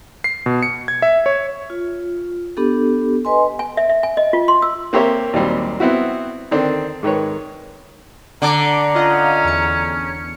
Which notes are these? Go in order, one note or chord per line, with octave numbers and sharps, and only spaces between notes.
C7
B2
C#7
G#6
E5
C#5
F4
B3 D4 G4 A4
B4 D#5 G#5 C6
G#5
E5
E5
G#5
D#5
F4
C6
E6
A#3 C4 G4 C#5 E5 A#5
D#2 A#2 F#3 G3 C4
B3 C4 E4 F#4
D3 D#3 C4 D4
G#2 D#3 B4 C#5
D3 A5 A#5 D6
C#4 F4 D#5 F#5
E2 C#7